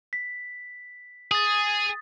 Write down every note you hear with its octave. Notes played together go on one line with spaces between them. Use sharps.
B6
G#4 D#6 A6